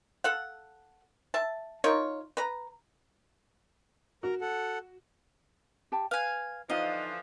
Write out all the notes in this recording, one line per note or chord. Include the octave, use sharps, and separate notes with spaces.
A4 F5 F#5
E5 A5
D#4 F4 A#4 C#5
B4 A#5
F#4 A#4 A#5
A4 F#5
G4 G5 A5
B4 F5 G#5
D3 E3 F3 D#4 F4 D#5 F5